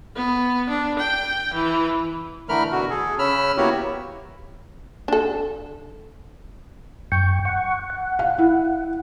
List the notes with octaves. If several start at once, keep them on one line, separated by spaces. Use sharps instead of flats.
B3
D4
G5
E3
D3 E3 A3 A#4 B5 F6
B2 D3 F#4
G#4 A4
C#3 C#4 B5 E6 F6
A#3 B3 E4 F#4 G4 C#5
D4 A4
F#2 G5 C#6
F#5 C#6
F#5
F5
E4